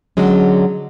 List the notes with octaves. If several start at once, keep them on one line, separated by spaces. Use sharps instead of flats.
D3 F#3 G#3 C#4